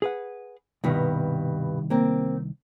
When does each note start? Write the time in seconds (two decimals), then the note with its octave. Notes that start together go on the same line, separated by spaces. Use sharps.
0.02 G#4 B4 F#5
0.84 C2 G2 B2 D#3
1.90 A#3 C4